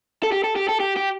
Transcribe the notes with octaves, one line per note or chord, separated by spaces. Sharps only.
A4
G4
A4
G4
A4
G4
G4